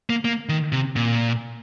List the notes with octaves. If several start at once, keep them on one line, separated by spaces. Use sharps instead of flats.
A#3
A#3
D#3
C3
A#2